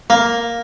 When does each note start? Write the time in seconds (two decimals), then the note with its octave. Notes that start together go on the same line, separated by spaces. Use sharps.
0.10 A#3